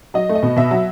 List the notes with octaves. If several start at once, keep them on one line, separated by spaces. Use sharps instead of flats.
F#3 D#5
A3
D#5
B2
B2 E5
F#3